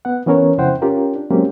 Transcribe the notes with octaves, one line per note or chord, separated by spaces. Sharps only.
B3 F#5
E3 B3 C#4 A#4 C#5
F2 C#3 E4 C5 F#5 G5
C#4 F4 G4 A#4
D4
F#3 G#3 A#3 C4 C#4 G4